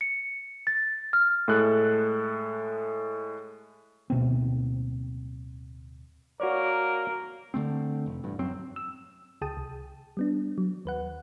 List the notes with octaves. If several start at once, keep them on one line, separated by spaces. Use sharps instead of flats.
C#7
A6
F6
A2 G#3 A4 F#6
D1 B2 A#3 C4
A#3 F#4 A#4 C#5 D5
D3 D#3 A3 C4
F1
A1 G2
F#2 F#3 C4
E6
C#2 G#4 G5 A5 D#6
C2
G3 B3 D4
F#3
D#2 B4 F#5